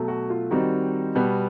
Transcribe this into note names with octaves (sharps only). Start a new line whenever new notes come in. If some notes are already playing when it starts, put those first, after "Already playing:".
Already playing: B2 F#3 A3
F#4
F4
D#3 G3 C4 D#4 F#4
B2 G3 B3